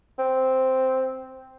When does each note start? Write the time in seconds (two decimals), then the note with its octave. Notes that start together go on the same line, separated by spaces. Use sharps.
0.19 C4